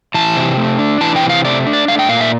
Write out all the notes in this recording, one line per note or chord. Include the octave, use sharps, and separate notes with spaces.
E3 A5
C3
A3
D4
E3 A5
G5
C3
F5
A3 D5
D4
D5
A3 F5
G5
A#2 F5
E5